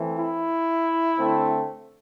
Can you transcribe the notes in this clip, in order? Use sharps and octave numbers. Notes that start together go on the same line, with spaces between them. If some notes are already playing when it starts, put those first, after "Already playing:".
Already playing: E3 A3 C4
E4
D3 A3 C4